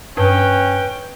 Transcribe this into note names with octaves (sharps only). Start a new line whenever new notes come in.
G2 C#4 B4 G5